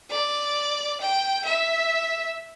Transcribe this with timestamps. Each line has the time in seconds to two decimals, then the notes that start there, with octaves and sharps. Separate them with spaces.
0.10 D5
1.01 G5
1.45 E5